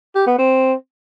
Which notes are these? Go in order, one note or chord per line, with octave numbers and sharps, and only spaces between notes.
G4
B3
C4